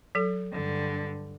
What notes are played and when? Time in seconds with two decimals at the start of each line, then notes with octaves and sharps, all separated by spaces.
0.15 F#3 A4
0.53 G2 D3